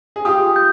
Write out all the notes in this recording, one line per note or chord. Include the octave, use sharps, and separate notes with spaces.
G#4
F4 G4 D#6
G6